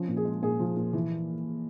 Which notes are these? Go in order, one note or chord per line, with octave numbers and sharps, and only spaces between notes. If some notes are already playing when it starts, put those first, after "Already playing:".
Already playing: F3 C#4
A#2
G#4
G#3
A#2 G#4
F3
A#2
E3